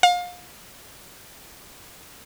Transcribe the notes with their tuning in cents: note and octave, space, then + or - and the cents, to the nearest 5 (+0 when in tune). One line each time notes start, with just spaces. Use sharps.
F5 +30